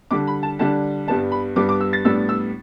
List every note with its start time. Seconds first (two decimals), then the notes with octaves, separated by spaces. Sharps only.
0.11 D3 G3 D4 D6
0.27 B5
0.43 A5
0.59 D3 G3 D4 A5
1.07 G2 G3 B3 D4 A5
1.32 B5
1.56 G2 G3 B3 D4 D6
1.69 D6
1.81 E6
1.93 A6
2.05 A2 G3 B3 D4 E6
2.29 E6